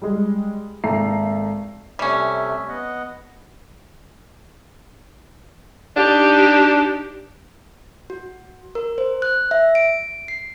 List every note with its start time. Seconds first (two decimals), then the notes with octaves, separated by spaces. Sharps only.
0.02 G3 G#3
0.84 G#1 A3 A#3 A#5 C7
1.99 C3 G3 A3 C#4 E5
2.68 B3 D#5 F#5
5.97 D4 D#4 G4
8.10 F#4
8.75 A#4
8.98 C5
9.22 F#6
9.51 E5
9.75 D7
10.28 C7